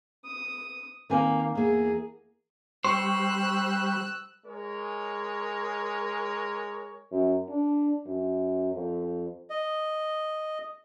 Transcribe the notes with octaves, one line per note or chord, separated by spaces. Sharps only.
D#6
D#3 A#3 C4 G#5
E2 A#3 G#4
G3 C5 C#6 E6 F#6
G#3 A#4 C#5
F#2
D4
F#2
F2
D#5